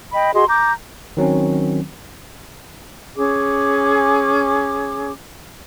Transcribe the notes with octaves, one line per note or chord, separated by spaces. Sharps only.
D#5 G5 B5
F#4 G#4 D#5 C6
A#5 D6 G6
D#3 F#3 C4 C#4
C#4 G#4 D6